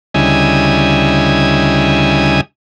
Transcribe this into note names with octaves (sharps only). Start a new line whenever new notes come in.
D2 C#3 G3 E4 D#5 G#5